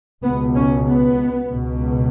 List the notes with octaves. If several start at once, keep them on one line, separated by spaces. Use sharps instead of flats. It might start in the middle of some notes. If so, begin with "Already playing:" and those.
C#2 B2 B3
C#4
B3
C#2 B2